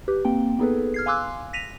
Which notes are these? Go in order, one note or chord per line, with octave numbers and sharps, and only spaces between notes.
G4 B4
A#3 C4 G5
B3 D#4 G#4 A4 B4
F6 G#6 C7
F5 G#5 C6 D6 E6 F#6
A#6 B6 D#7 F7